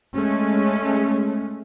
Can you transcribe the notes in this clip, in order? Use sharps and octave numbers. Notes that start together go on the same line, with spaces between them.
G#3 A3 C#4